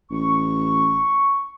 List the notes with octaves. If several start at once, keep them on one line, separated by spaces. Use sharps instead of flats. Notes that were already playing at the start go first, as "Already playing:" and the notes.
A1 C#6